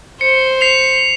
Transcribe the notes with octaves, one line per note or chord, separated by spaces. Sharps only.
C5 C#7
C7 F7